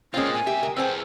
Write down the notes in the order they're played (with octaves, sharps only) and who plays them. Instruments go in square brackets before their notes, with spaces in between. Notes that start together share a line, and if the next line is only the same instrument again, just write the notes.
[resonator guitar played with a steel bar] G#3 C4 [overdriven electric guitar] A#3 F4 [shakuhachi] C#4
[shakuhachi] G#5
[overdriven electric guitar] C#2 E5 [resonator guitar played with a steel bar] G4
[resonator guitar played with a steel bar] A#4
[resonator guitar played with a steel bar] C4 G5 G#5 [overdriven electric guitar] G#4 B4 [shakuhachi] C5